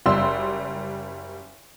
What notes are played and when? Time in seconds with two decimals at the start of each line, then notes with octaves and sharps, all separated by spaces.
0.06 F#1 G3 C6 E6